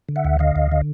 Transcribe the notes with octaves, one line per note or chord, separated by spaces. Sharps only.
D3
E5 F#5
D2
D3 D#5 F5
D2
D3